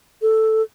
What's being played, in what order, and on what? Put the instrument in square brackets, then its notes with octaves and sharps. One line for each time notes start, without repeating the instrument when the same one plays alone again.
[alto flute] A4